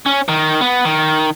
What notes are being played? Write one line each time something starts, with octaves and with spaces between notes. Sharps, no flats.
C#4
D#3
B3
D#3